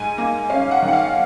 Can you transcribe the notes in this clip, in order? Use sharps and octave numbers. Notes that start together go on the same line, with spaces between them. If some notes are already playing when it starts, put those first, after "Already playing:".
Already playing: G#2 G#5
A#3
C#4 F5
F#5
D#3
F#5
F5